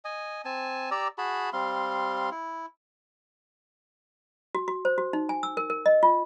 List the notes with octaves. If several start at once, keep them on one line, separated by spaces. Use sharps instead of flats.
D#5 G#5
C4 G#5 A5
G4 D5 A#5 E6
F#4 G#4 A5 B5
G3 C4 F5 C6
E4
F#4
F#4
C5
F#4
D#4
G#5
E6
A#4
A#4
D#5
F4